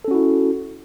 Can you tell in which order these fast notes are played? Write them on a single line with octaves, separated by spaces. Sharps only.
A4 C#4 F#4 E4